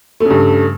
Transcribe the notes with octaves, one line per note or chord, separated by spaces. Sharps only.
G2 C#3 A3